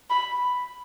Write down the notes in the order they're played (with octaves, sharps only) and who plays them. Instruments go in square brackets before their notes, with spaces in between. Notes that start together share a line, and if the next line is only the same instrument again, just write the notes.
[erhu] B5